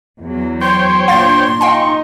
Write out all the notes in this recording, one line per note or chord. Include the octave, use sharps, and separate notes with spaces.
E2 F#3
C5 C#5 G5 C6
A#2 D4 F5 F#5 C6 A6
D#4 F5 G5 G#5 C#6